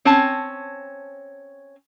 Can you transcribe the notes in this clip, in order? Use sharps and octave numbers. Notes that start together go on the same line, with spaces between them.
C4 C#4 C#5 A5